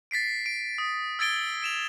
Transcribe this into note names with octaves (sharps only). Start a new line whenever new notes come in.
A6 B6 C7 D7
D7
D#6
E6 G#6 A6 D7 G7
D7 E7 F7